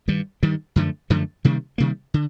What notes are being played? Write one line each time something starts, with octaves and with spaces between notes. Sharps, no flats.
G2 D#3 G3
G2 D#3 G3
F#2 D3 F3 A3
F#2 D3 F3 A3
C3 D#3 G3 A#3
C3 D#3 G3 A#3
D3